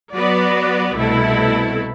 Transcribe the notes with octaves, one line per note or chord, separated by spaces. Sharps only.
F#3 B3 F#4 B4 D5
C2 B2 A3 E4 A4